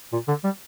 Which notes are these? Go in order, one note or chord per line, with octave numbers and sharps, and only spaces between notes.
A#2
D3
G3